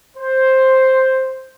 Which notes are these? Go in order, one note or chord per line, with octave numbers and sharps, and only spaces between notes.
C5